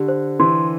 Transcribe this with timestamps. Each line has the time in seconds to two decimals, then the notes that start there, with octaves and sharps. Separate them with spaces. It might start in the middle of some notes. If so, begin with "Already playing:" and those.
Already playing: D3 G4
0.08 C5
0.40 E3 C6